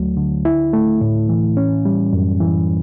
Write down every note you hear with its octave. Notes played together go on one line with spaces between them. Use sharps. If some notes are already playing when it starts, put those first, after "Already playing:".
Already playing: D2 F#3 A3
D3
E4
A3
A2
E3
C#4
G3
F#2
E3